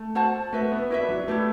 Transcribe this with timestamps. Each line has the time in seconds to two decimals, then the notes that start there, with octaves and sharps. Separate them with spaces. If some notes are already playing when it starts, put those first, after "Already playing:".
Already playing: A3
0.15 F#4 C5 F#5 A5
0.53 A3 F#4 B4 E5
0.72 B3
0.90 E4 F#4 B4 E5
1.00 D4
1.09 F#3
1.19 F#3
1.28 A3 E4 G4 B4